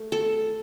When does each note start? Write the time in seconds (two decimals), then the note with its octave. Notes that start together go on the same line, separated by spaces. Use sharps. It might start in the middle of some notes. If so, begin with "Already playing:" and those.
Already playing: A3
0.12 A4